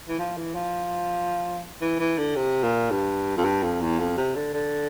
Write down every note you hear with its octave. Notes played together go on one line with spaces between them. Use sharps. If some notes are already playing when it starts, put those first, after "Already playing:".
E3
F3
E3
F3
E3
E3
D3
C3
A#2
G2
F2
G2
F2
E2
F2
C3
D3
D3